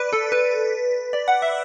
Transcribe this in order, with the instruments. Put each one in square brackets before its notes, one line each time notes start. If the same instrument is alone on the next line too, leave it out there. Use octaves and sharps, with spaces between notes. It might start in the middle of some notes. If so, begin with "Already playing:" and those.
Already playing: [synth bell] B4 D5
A4
B4
D5
F#5
E5